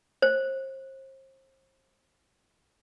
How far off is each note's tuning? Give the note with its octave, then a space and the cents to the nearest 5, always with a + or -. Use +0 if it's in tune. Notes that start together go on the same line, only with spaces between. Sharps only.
C5 +35